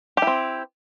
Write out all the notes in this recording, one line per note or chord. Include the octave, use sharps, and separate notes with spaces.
C4 E4 G4